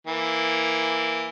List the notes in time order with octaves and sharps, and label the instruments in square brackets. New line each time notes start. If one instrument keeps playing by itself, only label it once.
[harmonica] E3 A#3